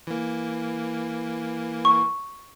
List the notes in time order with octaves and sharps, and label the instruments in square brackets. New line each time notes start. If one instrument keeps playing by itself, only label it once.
[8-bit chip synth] E3 A#3
[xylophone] C#6